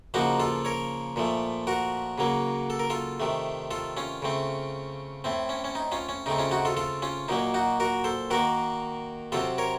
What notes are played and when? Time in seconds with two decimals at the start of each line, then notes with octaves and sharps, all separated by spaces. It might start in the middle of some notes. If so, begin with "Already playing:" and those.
0.14 C#3 F3 A#3 D#4 F#4
0.40 F4 A4
0.65 A#4 C#5
1.16 A#2 F3 A3
1.67 F#4 A#4
2.18 C#3 F#3 A#3
2.70 A4
2.79 A#4
2.90 F4 A4
3.20 C3 D#3 A3
3.71 F4 A4
3.97 C#4 F4
4.22 C#3 A3 C4
5.24 A2 A3 C4
5.49 C#4
5.64 C#4
5.75 D#4
5.92 C#4 F4
6.09 C#4
6.26 C#3 A3 C4 D#4
6.38 C#4 F4
6.51 D#4 F#4
6.65 F4 A4
6.77 F4 A4
7.02 C#4 F4
7.28 A#2 F#3 A#3 D#4
7.54 D#4 F#4
7.80 F#4 A#4
8.04 A4 C5
8.30 D#3 A#3 F#4 A#4
9.32 C3 F#3 C4 F4 A4
9.58 A#4 C#5